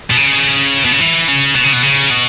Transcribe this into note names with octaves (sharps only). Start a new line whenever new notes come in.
B2
C#3
B2
C#3
E3
C#3
B2
C#3
B2
C#3
B2